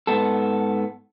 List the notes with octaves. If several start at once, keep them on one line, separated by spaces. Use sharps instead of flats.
G#2 B3 A4